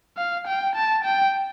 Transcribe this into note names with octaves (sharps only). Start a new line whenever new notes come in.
F5
G5
A5
G5